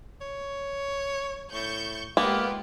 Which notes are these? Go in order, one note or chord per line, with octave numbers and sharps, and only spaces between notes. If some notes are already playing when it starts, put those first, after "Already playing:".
C#5
A2 C#6 G6
G#3 A#3 B3 F4 G4